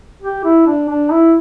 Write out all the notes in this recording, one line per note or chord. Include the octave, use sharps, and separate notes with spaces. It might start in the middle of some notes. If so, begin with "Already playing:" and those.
G4
E4
D4
D4
E4